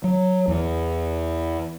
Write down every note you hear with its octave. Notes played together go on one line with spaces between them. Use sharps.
F#3
E2